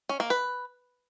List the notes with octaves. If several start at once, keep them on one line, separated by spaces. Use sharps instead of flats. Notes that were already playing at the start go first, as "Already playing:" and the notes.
C#4
A#3
B4